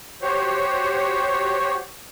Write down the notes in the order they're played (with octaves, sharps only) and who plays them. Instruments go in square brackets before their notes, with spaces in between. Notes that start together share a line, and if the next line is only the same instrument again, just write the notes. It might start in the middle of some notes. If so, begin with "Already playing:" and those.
[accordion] F#4 G4 C5 C#5